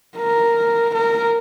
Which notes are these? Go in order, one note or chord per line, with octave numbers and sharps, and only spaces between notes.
A#4
A#4